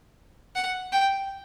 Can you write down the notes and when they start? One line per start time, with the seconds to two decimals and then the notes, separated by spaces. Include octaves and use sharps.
0.55 F#5
0.92 G5